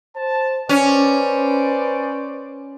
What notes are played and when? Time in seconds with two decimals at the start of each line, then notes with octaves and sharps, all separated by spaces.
0.16 C5 A5
0.69 C#4 B4 C5 D5